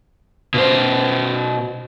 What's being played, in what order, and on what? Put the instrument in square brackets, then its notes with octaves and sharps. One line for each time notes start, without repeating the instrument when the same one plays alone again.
[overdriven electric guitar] B2 C5